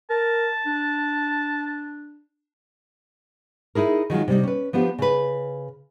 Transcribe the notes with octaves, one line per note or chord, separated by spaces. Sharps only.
A#4 A5
D4
D#4 E4 G#4 A#4
D#3 F#3 G#3 F4
C3 G3 D#4
C#4 B4
F3 B3 D4 G4 C5
C#3 B4